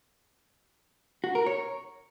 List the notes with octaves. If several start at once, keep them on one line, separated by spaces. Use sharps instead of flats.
F#4
A#4
C#5